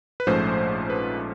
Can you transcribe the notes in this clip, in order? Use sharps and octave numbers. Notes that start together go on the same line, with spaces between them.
B4
A#1 G#2 F3 A3 C#4 C5
B4